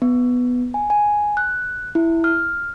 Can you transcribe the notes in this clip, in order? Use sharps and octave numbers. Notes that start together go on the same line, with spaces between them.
B3
G#5
G#5
F#6
E4
F6